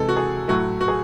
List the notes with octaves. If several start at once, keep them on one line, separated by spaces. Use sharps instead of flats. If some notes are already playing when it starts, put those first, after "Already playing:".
Already playing: C3 E3 G#3 A4
F#4
G#4
A2 F#3 A3 F#4
F#4
G#4